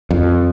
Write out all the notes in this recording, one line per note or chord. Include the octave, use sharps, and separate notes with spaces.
F2